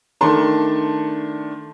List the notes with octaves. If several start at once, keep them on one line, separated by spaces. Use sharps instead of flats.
D#3 A3 D4 A5 C6